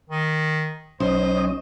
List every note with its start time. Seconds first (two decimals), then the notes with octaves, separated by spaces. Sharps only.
0.10 D#3
1.00 B1 C#4 C5 D#5